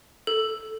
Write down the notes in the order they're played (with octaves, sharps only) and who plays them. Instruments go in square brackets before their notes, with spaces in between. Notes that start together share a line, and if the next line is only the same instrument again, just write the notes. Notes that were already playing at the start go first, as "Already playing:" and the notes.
[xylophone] A4